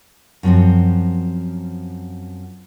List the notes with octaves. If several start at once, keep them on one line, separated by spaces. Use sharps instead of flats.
F#2 F3 C4 F#4